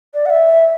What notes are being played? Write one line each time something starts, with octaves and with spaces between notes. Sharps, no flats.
D5
F#5
E5